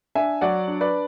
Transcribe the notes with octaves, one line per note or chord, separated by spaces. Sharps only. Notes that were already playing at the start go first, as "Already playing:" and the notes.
D4 E5 G#5
F#3 D5 F#5
D4
B4 D5